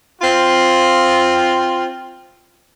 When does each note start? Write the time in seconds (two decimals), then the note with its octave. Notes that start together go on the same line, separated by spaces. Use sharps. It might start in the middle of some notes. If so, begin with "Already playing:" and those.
0.22 C4 F4